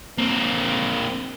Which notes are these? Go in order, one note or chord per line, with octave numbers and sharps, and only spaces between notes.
A#3 C4